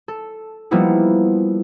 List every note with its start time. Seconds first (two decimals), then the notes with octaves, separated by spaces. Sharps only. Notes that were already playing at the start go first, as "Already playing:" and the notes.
0.08 A4
0.71 F3 G3 A#3 B3 D#4 E4